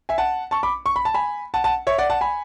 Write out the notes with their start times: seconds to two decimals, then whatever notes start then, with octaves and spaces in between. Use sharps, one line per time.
0.09 E5 G#5
0.18 F#5 A5
0.51 A5 C#6
0.63 B5 D6
0.86 C#6
0.96 B5
1.05 A5
1.14 G#5 B5
1.54 F#5 A5
1.64 F#5 A5
1.87 C#5 E5
1.98 D5 F#5
2.10 F#5 A5
2.21 G#5 B5